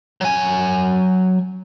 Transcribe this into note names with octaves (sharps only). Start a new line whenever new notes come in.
F#3 G#5